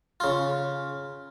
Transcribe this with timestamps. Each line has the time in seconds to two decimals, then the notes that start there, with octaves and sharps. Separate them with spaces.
0.20 C#3 F4